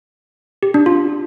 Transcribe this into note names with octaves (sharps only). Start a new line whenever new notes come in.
G4
D4
F4